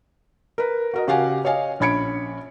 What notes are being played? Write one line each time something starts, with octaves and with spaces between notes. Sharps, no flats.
A#4 B4
F#4 A#4 D#5
C#3 F#4 G4 F5 F#5 G#5
C#5 D#5 F5 G#5
A#1 C#4 B5 G#6 C#7 D7